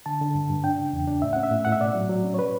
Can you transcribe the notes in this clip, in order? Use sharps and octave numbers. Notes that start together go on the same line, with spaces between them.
D3 A5
D3
G2
G2
D4 G5
C#3
E2
D4
A2 E5
C#4 F#5
E5
A2
A2 F#5
E5
B2 D5
F#3
F#3
C#4
C#5
B4